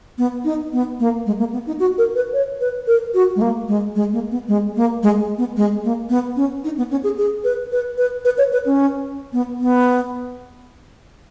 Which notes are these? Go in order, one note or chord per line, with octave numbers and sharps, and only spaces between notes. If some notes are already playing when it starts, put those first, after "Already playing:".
B3
D#4
B3
A#3
G#3
A#3
B3
D#4
F#4
A#4
B4
C#5
B4
A#4
F#4
G#3
A#3
G#3
G#3
A#3
B3
G#3
A#3
G#3
B3
G#3
A#3
B3
C#4
D#4
B3
C#4
G#4
G#4
B4
B4
B4
B4
C#5
B4
C#4
B3
B3